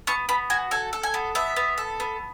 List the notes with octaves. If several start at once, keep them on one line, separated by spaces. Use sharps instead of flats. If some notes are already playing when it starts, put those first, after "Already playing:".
B3 C#6
B3 B5
F#4 G#5
A4 G#5
A4
G#5
B3
B3 E5
B3
A4
B3